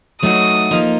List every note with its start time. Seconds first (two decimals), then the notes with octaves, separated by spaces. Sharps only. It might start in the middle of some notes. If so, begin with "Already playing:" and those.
0.22 F#3 A3 D#4 F#4 D#6
0.71 F3 A#3 D#4